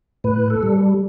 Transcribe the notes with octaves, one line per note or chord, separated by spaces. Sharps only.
A2 B4
A4
G3